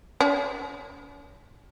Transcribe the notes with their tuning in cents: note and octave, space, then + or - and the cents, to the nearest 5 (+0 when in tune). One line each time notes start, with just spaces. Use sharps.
C#4 +40